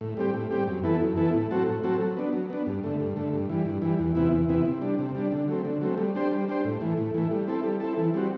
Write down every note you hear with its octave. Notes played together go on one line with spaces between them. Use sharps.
A2
G3 C4 G4
A2
G3 C4 G4
F#2
E3 B3 E4 A4
F#2
E3 B3 E4 A4
A2
F#3 C4 F#4 A4
A2
F#3 C4 F#4 A4
F#3
B3 D4
F#3
B3 D4
G2
D3 A3
G2
D3 A3
G2
E3 G3
G2
E3 G3
E2
C3 E3 B3 E4
E2
C3 E3 B3 E4
C3
G3 D4
C3
G3 D4
D3
F#3 A3 C4
D3
F#3 A3 C4
G3
D4 G4 C5
G3
D4 G4 C5
A2
E3 A3
A2
E3 A3
G3
C4 E4 A4
G3
C4 E4 A4
E3
G3 C4 F#4